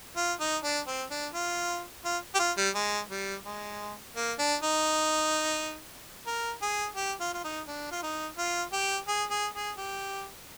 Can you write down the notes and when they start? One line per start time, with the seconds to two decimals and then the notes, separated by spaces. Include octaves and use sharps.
0.16 F4
0.40 D#4
0.63 D4
0.87 C4
1.10 D4
1.34 F4
2.05 F4
2.35 G4
2.39 F4
2.57 G3
2.75 G#3
3.11 G3
3.45 G#3
4.16 A#3
4.39 D4
4.63 D#4
6.26 A#4
6.62 G#4
6.96 G4
7.20 F4
7.34 F4
7.44 D#4
7.67 D4
7.91 F4
8.03 D#4
8.38 F4
8.72 G4
9.07 G#4
9.30 G#4
9.55 G#4
9.77 G4